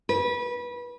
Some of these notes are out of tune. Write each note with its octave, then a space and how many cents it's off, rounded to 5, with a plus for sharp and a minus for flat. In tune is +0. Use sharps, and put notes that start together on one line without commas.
B4 -25